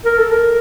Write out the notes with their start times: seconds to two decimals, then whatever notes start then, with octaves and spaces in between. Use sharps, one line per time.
0.05 A#4
0.18 A4
0.32 A#4